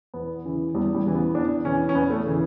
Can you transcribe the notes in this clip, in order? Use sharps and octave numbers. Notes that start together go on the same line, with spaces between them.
E2 B3
C#3 E3
E2 G3
G3
C#3 E3
B3
E2 D4
C#3 E3 C#4
C#4
E2 B3
A3
C#3 E3